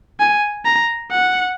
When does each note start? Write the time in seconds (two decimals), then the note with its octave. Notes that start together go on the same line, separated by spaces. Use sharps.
0.20 G#5
0.65 A#5
1.11 F#5